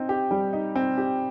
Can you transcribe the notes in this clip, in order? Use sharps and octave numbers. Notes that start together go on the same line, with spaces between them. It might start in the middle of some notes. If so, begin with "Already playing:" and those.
Already playing: C4 D#4
G4
G3
D#4
C4
G4